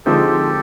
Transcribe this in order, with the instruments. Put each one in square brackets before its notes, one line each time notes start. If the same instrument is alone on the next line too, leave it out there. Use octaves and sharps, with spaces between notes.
[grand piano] D3 F3 G#3 C4 D#4 [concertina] G4 A4